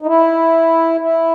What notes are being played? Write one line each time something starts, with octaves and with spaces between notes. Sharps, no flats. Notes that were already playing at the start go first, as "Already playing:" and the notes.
D#4
E4
E4